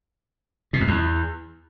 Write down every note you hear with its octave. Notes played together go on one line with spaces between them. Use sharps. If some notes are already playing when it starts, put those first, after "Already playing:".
B2
F2
E2